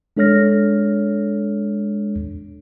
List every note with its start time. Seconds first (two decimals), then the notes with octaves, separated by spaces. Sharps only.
0.17 G#3 D4 A4 C#5 F6 A#6